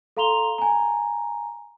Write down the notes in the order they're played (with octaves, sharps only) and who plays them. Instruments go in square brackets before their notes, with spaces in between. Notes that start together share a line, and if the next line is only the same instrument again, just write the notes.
[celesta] A4 F5 A#5 C6 F7 G7
G#5 A#5